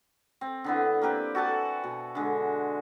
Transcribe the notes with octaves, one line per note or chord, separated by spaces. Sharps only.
C4
D3 B3 E4
A#3 C4 G4 B4
F#4 A4 G#5 A5
B2
D3 G#3